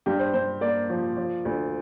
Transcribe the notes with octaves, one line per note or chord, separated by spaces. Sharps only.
G2 G4
C5
G2 C5
A#3 D5
F3
F3
D2